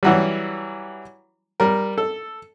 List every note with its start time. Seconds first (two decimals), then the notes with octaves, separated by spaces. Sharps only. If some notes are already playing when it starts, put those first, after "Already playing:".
0.03 E3 F#3 G3
1.60 G3 A#4
1.98 A4